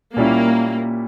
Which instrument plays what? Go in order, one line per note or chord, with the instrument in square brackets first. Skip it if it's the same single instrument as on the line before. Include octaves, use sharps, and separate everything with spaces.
[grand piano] A#2 G3 C#4 E4 [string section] A#3